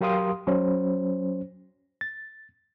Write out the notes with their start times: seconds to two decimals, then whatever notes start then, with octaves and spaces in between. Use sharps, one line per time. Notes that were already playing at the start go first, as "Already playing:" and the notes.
0.01 F#3 G4 A#4 F5 C6 D#6
0.47 F#3 C#4 C5
2.01 A6